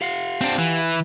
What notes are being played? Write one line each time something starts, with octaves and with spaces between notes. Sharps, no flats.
G4 F5 F#5
C4 D4
E3